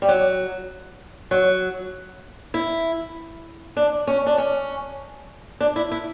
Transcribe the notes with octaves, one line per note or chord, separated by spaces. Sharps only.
G3
F#3
F#3
E4
D4
C#4
D4
C#4
D4
E4
E4